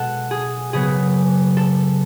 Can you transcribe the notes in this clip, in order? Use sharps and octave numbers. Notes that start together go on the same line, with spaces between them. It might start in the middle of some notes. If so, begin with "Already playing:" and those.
Already playing: B2 G#3 B3 A4 F#5
G#4
C#3 F#3 B3 G#4
A4